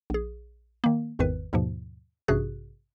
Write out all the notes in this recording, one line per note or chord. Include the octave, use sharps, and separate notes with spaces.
A#1 G#4
D#3 A#3
G#1 E2 G#2 D#3 B4
D#2 G#2 B2 F3
A1 G2 C3 F#4 G#4 F#6